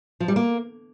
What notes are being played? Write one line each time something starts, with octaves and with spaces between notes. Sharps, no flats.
F3
G3
A#3